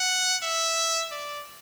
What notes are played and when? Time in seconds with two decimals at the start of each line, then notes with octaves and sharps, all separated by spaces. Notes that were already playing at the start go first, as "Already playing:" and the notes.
Already playing: F#5
0.43 E5
1.12 D5